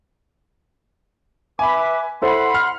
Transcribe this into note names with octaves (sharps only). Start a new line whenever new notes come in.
B4 E5 G#5 B5 D6
E4 A4 C5 F#5 B5 C6
F6